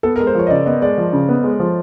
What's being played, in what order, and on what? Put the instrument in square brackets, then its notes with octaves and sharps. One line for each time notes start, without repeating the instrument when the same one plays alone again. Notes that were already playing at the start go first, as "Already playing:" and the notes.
[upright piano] B3 [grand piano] A4
[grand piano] A#4
[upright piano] G#3
[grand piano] C5
[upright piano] F3 [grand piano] C#5
[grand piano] D#5
[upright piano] C#3 [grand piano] D5
[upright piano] B3 [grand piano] D#5
[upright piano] G#3 [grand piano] D5
[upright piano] F3
C#3
B3
G#3
F3